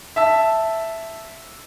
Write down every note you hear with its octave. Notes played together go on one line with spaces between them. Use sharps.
E5 A5 E6